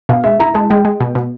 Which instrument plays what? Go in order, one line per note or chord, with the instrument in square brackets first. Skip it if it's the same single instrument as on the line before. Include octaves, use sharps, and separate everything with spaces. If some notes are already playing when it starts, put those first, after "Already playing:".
[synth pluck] B2 [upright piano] F5
[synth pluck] G#3 [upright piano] E5
[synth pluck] E4 [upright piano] A#5
[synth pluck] G#3 [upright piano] A5
[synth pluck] G#3 [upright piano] G5
[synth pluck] G#3
B2
B2